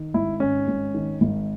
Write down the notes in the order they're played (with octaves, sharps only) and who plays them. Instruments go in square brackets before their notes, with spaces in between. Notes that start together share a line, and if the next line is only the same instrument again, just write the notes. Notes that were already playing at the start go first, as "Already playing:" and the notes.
Already playing: [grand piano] D#3
G#1 E4
G#2 C#4
G#1
D#3
G#1